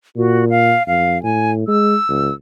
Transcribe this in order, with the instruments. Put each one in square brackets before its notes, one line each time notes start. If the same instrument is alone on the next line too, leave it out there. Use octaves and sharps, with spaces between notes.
[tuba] A#2 [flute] F#4
[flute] F5
[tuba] F2 [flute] F5
[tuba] A2 [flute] G#5
[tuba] G#3 [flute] E6
[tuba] C#2